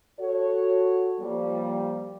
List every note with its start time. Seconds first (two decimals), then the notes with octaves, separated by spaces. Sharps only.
0.19 F#4 A4 C#5
1.20 F3 G3 A#3